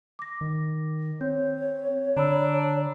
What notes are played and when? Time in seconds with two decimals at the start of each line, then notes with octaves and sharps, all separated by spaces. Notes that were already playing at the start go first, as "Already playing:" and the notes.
0.19 D6 A#6
0.41 D#3
1.21 C4 C#5 G6
2.17 D3 D4 A#5 B5 E6